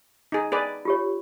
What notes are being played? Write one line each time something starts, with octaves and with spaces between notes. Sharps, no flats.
D#4 G#4
G#4 B4 D5
F4 G4 C#5